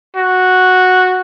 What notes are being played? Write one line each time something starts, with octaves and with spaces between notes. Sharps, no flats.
F#4